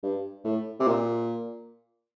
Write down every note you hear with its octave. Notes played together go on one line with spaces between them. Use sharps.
G2
A2
C3
A#2